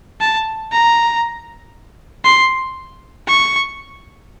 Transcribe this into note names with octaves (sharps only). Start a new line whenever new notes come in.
A5
A#5
C6
C#6